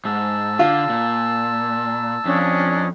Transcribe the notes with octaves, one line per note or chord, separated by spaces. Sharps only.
G#2 A5 E6
D3 F4
A#2
F2 C#4 D4 D#6